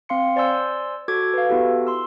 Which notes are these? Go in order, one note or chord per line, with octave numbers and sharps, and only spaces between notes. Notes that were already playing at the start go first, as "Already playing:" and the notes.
C4 F5 C6 C#7
C5 D5 G#5 C6 E6 G6
F#4 A4 D6 G#6
B4 F5
B3 E4 F#4 G4 A4
C6 E6